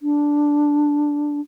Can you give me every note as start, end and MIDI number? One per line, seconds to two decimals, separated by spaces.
0.01 1.41 62